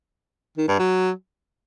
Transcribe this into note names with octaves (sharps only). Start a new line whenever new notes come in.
D#3
G2
F#3